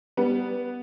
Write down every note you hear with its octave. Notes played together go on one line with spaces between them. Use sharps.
G3 B3